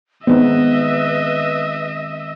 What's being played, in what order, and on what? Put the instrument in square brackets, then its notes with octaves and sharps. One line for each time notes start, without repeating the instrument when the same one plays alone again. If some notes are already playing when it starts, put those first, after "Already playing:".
[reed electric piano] D#3 G#3 C4 [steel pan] B3 D#4 [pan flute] B4 [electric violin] D#5 E5